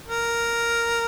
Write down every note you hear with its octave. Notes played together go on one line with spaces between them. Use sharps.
A#4